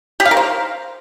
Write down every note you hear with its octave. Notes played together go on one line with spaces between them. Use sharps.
G4
F5
A#4
C5